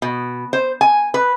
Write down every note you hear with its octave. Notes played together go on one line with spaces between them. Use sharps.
B2
C5
G#5
B4